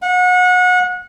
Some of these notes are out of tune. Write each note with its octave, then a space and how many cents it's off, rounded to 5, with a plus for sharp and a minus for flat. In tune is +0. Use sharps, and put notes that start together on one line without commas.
F#5 -30